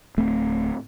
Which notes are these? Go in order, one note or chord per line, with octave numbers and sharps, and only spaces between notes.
D1 A3 C4